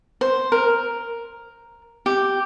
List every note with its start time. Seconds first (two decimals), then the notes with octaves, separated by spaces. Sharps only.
0.21 C5
0.52 A#4
2.06 G4